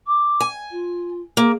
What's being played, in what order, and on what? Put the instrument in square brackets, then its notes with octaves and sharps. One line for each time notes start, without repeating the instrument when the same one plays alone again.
[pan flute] D6
[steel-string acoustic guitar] G#5
[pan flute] F4
[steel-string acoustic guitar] A#3 [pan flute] G#4